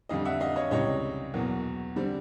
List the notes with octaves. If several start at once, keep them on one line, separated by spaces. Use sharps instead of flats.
F2 D3 G3 D#5 F5
E5 F#5
D#5 F5
C#5 D#5
C#2 C3 E3 G3 C#5 D#5
E2 B2 F#3 A#3
D3 G3 C4